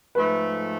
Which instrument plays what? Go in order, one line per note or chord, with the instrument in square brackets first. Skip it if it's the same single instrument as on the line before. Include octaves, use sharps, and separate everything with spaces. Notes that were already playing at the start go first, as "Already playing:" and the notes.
[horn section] G#2 F3 A3 [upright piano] B4